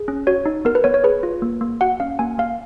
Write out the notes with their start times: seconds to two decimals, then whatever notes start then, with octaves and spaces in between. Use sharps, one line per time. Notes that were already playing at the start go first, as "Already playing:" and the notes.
Already playing: G#4
0.08 C#4
0.27 F#4 C#5
0.46 D#4
0.65 B3 A#4
0.75 B4
0.84 B3 C#5
0.94 C#5
1.04 G#4 B4
1.23 F4
1.42 A#3
1.61 A#3
1.81 F#4 F#5
2.00 C#4 F5
2.19 A#3 G#5
2.38 A#3 F5